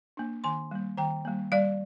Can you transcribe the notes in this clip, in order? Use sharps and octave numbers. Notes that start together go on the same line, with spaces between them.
A#3 D4
D#3 G#5 C6
G3 A#3
D#3 G5 A#5
G3 A#3
G3 D5 F5